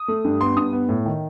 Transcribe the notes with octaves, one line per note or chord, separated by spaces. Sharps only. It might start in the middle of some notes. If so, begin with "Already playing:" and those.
Already playing: D#6
A3
G2
B3 C6
G2 D#6
B3
A2
D#3